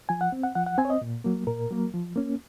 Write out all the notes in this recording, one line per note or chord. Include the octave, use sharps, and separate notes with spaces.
F3 G#5
F#5
C4
F#5
F3 F#5
F#5
C4 G#5
C#5
D#5
A#2
F#3 A#3
A#2 A#4
F#3 A#3
F3
A#3 C#4